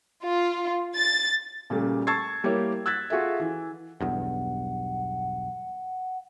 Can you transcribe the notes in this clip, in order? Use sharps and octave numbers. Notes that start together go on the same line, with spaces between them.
F4
A6
A#2 C#3 G3 A3
A5 C#6 E6 G#6 A6 C7
G3 A#3 E4 G4 C#5
E6 F#6 G#6 A6 B6
F4 F#4 G#4 A4 E5
E3
B1 E2 G2 F#5